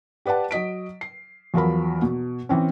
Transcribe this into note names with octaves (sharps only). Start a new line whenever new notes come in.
G4 B4 D5 F#5 A5
F#3 D#5 B6 D7
C7
E2 F3 F#3 A#4 B5
B2
E3 C4 C#4